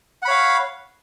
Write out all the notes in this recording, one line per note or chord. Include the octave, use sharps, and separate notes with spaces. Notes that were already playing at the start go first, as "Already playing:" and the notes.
C#5 F5 F#5 B5